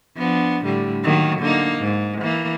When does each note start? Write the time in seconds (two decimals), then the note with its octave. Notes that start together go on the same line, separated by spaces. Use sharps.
0.17 F3 B3 D4
0.65 A2 D3 G3
1.04 D#3 F#3 A#3
1.40 D3 A#3 D#4
1.79 G#2
2.21 E3 A#3